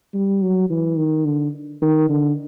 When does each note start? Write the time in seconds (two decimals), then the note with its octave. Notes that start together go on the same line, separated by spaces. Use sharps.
0.14 G3
0.42 F#3
0.70 E3
0.97 D#3
1.25 D3
1.82 D#3
2.09 D3